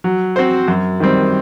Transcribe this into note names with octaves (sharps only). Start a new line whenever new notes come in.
F#3
C4 F#4 C5
F#2
D#3 G3 C4